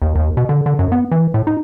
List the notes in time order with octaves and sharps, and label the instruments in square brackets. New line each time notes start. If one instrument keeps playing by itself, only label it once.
[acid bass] D#2
D#2
B2
D3
D3
F#2
B3
E3
A2
D#4